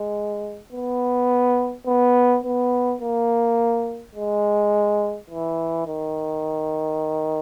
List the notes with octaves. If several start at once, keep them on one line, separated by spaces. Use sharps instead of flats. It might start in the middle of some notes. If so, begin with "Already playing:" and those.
Already playing: G#3
B3
B3
B3
A#3
G#3
E3
D#3